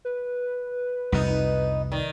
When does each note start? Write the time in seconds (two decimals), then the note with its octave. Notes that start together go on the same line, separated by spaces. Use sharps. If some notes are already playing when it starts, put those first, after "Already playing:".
0.05 B4
1.12 C2 F2 C3 B3 D#4
1.92 D#3 D5